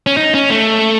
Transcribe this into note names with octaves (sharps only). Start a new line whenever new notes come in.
C#4
D#4
C#4
A3